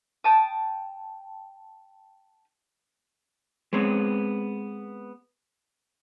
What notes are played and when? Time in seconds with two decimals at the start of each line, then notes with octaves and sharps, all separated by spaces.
0.24 G5 A5 D#6
3.73 G#3 B3 C4 C#5